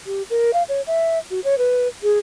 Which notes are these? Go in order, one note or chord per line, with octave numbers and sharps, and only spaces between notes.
G4
A#4
F5
C#5
E5
F#4
C#5
B4
G#4